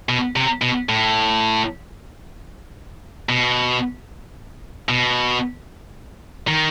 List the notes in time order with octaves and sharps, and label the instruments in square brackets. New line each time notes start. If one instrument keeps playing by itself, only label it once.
[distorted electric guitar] B2
C3
B2
A2
B2
B2
D#3